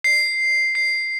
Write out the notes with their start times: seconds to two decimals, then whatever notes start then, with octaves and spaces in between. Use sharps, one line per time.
0.04 C7
0.75 C7